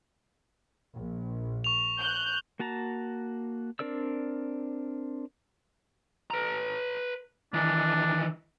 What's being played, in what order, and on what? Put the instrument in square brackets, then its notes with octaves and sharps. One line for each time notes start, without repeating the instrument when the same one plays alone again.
[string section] A#1
[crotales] C#6 F7
[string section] F#6 G6
[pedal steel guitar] A#3 F#4 A5 A#5
C4 D4 A#4 D5 E6
[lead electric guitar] B4 A#5
[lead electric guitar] D#3 E3 [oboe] D4